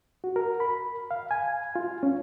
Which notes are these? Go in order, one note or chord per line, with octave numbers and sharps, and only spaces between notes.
F#4
A#4
B5
F5
G#5
F4
C#4